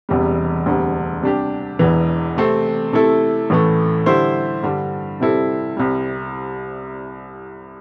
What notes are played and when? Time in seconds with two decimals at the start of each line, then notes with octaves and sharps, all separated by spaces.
0.09 E1 E2 C3 G3
0.66 E1 D2 C3 G3
1.23 C3 G3 D4 G4
1.79 E1 E2 E3
2.37 C3 A3 C4
2.93 C3 A3 E4 A4
3.50 A1 A2 E3 A3
4.06 D3 G3 E4 C5
4.63 G2 D3 G3
5.20 C3 G3 C4 E4 A4
5.77 C2 C3 G3